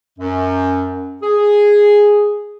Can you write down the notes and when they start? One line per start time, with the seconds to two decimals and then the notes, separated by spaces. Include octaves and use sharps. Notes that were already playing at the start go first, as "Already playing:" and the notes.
0.18 F#2
1.22 G#4